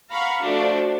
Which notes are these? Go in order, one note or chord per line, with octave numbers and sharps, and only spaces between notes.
F5 F#5 A#5 B5 C#6
F3 A3 D4 F#4